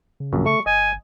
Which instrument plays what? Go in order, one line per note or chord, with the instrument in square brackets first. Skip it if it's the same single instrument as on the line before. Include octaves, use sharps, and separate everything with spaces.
[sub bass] C#3
[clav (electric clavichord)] A#1 F#2
[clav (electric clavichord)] A3 [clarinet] C#6
[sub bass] G1 [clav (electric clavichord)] D#5 [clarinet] G#5